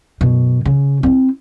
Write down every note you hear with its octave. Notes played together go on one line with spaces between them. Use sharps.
F#2 B2
C#3
C4 E4